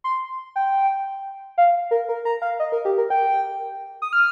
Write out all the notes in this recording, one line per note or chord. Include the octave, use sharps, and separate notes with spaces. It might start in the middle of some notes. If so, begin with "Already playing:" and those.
C6
G5
F5
A#4
A#4
A#5
F5
D#5
A#4
G4
A#4
G5
D#6
F6